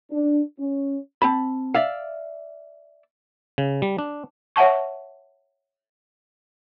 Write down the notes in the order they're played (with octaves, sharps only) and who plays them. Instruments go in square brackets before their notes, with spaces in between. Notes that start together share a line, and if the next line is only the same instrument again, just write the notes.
[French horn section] D4
C#4
[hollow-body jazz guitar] C4 A5 B5
D5 E5 F5
[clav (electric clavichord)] C#3
G3
D4
[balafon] C#5 E5 F#5 A5 C#6